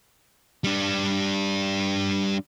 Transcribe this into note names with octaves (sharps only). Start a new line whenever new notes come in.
G3 D4